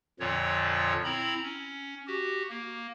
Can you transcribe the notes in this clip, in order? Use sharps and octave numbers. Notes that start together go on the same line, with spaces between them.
F2 A#2 D3 F3 C#5
C4 E4 A#5 B5
C#4
F#4 G4
A#3